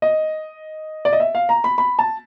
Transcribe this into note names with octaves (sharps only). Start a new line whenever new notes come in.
D#5
D5
D#5
E5
F5
A#5
B5
B5
A5